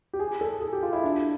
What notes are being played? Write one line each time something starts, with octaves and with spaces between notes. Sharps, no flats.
G4
G#4
A4
G#4
G4
F4
E4
D4